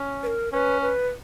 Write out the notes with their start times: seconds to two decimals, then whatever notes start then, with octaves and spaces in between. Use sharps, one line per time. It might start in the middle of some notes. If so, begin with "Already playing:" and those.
Already playing: C#4
0.23 B4
0.27 A#4
0.52 C#4 B4
0.82 B4